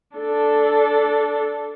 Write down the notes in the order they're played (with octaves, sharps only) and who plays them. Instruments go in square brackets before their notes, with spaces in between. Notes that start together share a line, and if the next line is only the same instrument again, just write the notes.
[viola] D4 A4